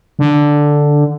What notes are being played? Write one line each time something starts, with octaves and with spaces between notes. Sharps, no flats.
D3